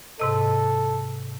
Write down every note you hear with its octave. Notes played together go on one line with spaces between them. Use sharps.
G#2 C3 A4 D#5